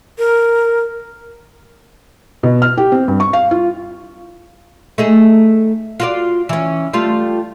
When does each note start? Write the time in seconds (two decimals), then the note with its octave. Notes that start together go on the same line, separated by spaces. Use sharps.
0.19 A#4
2.43 B2
2.62 F6
2.77 G4
2.92 C4
3.08 G2
3.20 C#6
3.33 F5
3.51 F4
4.98 A3 D#4 G#4
6.00 F4 F#4 D5
6.49 E3 C#4
6.93 G3 A3 F4